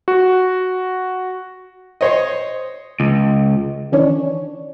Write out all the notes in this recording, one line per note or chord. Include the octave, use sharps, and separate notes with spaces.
F#4
C5 C#5 D#5
C#2
D#3 E3 C#4 D4 C#5